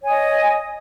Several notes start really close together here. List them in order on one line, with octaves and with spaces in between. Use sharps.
C#5 G#5 D#6 D#5